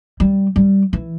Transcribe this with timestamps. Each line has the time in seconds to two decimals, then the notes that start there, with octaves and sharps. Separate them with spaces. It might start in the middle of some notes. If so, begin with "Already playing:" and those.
0.20 G3
0.56 G3
0.93 E3